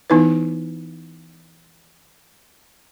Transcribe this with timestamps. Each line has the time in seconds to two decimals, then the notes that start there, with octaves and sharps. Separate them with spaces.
0.10 E3 B3 D#4 E4 B4